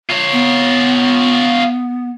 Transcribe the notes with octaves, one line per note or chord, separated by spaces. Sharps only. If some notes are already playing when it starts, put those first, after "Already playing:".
F4 C#5
B3